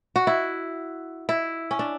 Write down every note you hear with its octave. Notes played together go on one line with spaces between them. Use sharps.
F#4
E4
E4
C#4
D4